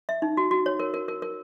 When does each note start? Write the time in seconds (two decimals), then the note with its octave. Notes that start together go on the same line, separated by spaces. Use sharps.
0.09 E5
0.22 D#4
0.37 F#4
0.51 F#4
0.66 C#5
0.80 A#4
0.94 A#4
1.08 A#4
1.22 A#4